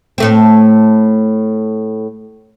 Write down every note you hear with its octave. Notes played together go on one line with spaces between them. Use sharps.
A2 A3 C4